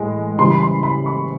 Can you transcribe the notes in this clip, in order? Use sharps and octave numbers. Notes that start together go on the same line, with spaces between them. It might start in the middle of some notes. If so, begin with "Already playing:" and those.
Already playing: A2 E3 G#3
C#3 E3 G3 C6
B5
C6
B5
C#6